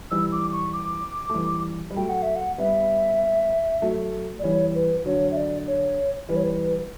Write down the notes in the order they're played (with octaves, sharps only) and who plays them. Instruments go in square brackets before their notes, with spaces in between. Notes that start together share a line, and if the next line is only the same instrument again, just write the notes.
[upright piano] E3 G3 [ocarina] E6
[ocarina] D6
C#6
D6
[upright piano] A3
E3 G3
G3
[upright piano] F#3 A3 [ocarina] G5
[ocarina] F#5
E5
F#5
[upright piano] G3 B3 [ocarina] E5
[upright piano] F#3 A3
[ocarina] D5
[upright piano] E3 G3 [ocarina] C#5
[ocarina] B4
[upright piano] D3 F#3 [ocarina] C#5
[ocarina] E5
D5
C#5
[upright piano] E3 G3 [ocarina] B4
[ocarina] C#5
B4